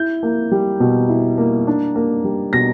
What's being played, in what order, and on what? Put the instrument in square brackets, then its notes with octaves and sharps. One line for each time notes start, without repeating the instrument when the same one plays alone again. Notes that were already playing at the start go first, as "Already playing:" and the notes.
Already playing: [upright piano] E4 G6
A#3
G3
B2
E4
A#3
D4
A#3
G3
B2 A#6